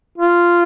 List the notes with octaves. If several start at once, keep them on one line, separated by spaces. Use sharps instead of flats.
F4